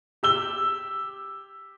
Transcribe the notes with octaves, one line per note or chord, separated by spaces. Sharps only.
G4 E6 G7